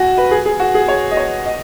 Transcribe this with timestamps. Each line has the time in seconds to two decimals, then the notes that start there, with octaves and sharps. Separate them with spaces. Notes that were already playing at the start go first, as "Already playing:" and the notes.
Already playing: F#4 G#5
0.18 B4
0.31 G#4
0.45 G#4
0.60 F#4
0.75 G#4
0.88 C#5
1.11 D#5
1.17 C#5
1.46 D#5